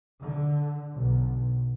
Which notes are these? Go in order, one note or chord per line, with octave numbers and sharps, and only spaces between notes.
D3
B1